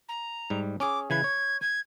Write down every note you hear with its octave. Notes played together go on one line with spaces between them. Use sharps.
A#5
G#2 G3
C#4 G#4 D6
C#3 E3 B4 G#6
C#5
G#6